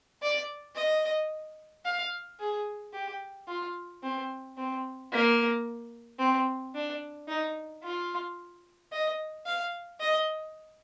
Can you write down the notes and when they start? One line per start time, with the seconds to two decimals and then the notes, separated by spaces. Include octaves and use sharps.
0.22 D5
0.76 D#5
1.85 F5
2.39 G#4
2.93 G4
3.48 F4
4.03 C4
4.57 C4
5.12 A#3
6.19 C4
6.75 D4
7.28 D#4
7.83 F4
8.92 D#5
9.46 F5
10.00 D#5